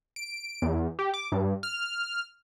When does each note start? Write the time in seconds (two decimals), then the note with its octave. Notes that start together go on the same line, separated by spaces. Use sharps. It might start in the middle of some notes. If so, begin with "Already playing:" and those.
0.16 D7
0.62 E2
0.99 G4
1.14 D6
1.32 G2
1.63 F6